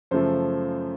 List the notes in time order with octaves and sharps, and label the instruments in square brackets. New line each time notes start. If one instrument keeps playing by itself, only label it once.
[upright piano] F#2 C#3 F3 A3 C5